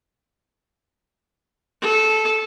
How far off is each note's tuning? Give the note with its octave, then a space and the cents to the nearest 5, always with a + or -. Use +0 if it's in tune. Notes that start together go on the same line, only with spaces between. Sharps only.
A4 -15